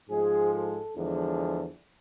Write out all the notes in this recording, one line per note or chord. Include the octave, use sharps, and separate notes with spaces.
G#2 F3 G#3 G#4
A4
E2 D3 F3 G#3